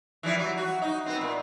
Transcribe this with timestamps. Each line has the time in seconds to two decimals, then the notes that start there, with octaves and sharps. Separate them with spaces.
0.23 E3 F3 G3
0.38 F#3
0.57 F#4
0.82 D#4
1.06 B3 C4
1.21 A#2